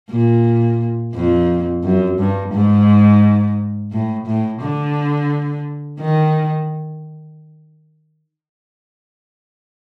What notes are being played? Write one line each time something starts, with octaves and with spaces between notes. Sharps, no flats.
A#2
F2
F#2
G2
G#2
A2
A2
D3
D#3